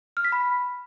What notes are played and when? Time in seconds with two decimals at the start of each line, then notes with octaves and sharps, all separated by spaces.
0.17 F6
0.25 B6
0.32 B5